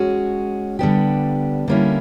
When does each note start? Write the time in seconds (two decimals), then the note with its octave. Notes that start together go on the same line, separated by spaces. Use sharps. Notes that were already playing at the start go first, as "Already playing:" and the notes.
Already playing: G#3 C#4 F#4
0.79 D3 G3 B3 D4 G4
1.68 D3 G3 A#3 C#4 E4